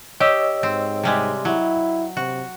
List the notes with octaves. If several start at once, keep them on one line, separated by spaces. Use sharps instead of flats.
G4 C#5 D#5 E6
G#2 C4
C3 G3 G#3
F#3 E4
C3 F#4